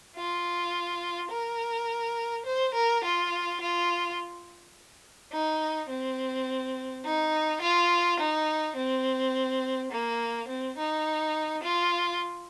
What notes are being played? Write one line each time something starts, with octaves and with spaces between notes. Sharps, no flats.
F4
A#4
C5
A#4
F4
F4
D#4
C4
D#4
F4
D#4
C4
A#3
C4
D#4
F4